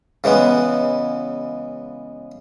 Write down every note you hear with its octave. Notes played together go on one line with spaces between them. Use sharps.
C#3 E3 G#3 B3